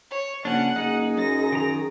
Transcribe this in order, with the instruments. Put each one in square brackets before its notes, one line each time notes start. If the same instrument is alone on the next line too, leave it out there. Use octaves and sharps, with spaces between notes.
[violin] C#5
[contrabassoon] A#1 [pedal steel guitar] C#3 C#4 D4 [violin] F#5
[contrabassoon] F#1 [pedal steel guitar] D#4 [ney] G#4
[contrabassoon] F#2 [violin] A#6
[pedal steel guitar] D#3 A#5